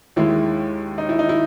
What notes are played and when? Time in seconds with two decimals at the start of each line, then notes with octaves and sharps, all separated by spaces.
0.16 D#2 D#3 G#3 E4
0.98 D#4
1.09 E4
1.19 D#4
1.29 E4